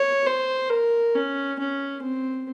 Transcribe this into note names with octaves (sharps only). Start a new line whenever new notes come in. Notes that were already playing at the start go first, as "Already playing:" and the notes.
Already playing: C#5
C5
A#4
C#4
C#4
C4